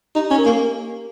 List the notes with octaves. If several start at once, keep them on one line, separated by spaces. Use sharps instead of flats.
D#4 G4
C#4
A#4
A#3